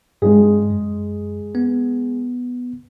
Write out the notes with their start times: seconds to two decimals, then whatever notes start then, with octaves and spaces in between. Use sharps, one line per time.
0.22 G2 G#3 G#4
0.70 F#2
1.55 B3